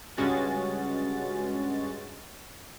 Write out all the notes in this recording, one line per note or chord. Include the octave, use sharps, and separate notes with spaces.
C#2 G2 G#3 C#4 F#4 A6